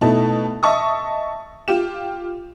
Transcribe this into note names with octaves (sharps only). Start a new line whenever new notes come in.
B2 A3 D#4 E4 A5
D#5 E5 A5 C#6 D#6
F4 G4 E7